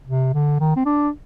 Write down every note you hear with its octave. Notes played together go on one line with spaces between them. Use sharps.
C3
D3
D#3
C4
D4